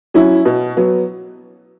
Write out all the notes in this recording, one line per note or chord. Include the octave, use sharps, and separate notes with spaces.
F#3 C#4 E4
B2
F#3 B3